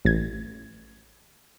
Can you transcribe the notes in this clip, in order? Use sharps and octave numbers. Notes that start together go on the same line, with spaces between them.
A1 G#6